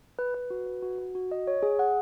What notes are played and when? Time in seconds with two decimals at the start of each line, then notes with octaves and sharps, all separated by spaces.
0.19 B4
0.34 B4
0.50 F#4
0.66 B4
0.82 F#4
0.99 F#4
1.15 F#4
1.31 D#5
1.47 C#5
1.63 G#4
1.79 F#5